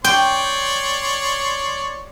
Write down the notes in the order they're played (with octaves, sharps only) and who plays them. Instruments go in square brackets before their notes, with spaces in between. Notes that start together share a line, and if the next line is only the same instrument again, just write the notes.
[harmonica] C#5 D5 C6 [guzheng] G5